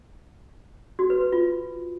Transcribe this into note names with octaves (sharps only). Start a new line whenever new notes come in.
F#4
B4
B4
F4